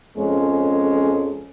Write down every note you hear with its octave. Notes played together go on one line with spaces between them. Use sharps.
F2 G#3 C#4 A4